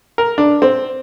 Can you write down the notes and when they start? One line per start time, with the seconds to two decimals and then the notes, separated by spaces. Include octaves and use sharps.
0.18 A#4
0.38 D4
0.62 C4